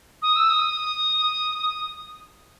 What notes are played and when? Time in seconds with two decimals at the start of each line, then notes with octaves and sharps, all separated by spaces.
0.22 D#6
0.36 E6
0.50 D#6